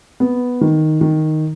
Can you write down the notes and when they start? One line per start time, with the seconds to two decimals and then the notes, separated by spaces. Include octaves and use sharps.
0.20 B3
0.61 D#3
1.01 D#3